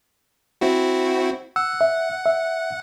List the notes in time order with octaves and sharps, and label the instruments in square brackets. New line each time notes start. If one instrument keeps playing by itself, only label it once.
[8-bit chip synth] C4 E4 F#4
[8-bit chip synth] F#5 [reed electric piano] E6
[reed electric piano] E5
E5